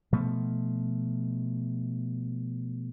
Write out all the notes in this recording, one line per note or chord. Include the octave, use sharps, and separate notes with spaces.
B2 F3 A3